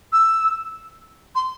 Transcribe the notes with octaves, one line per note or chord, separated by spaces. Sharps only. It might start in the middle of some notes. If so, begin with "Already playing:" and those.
E6
C6